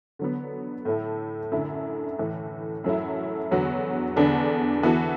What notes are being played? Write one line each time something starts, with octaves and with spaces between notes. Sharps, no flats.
D3 F#3 B3
A2 A3 E4 A4
F#2 D3 A3 E4
A2 E3 A3
F#2 F#3 A3 E4
E2 D3 F#3 B3 F#4
E2 D3 B3 D4
E3 B3 F#4 A4